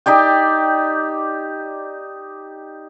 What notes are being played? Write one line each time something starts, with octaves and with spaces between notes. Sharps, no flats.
D#4 G4 D5 G5